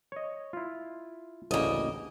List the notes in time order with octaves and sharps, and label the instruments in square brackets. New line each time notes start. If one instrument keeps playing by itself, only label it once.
[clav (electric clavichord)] C#5 D#5
E4 F4
[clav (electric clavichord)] A1 D2 C#3 [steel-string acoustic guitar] A#3 D#5